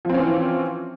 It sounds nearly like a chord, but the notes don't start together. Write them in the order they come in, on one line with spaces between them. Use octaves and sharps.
F3 C4 C#4 E3